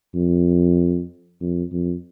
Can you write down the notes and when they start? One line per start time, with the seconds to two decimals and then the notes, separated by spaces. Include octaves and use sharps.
0.14 F2
1.41 F2
1.72 F2